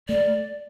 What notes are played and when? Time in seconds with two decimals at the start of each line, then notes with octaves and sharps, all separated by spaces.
0.09 A3 D5